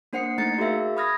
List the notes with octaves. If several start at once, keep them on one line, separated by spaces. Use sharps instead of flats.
A#3 D4 C5 F#5 C7 C#7
A3 D#4 A#5 A6 C#7
F#4 G#4 A#4 E5 F5
B5 D#6 F6 G#6 A#6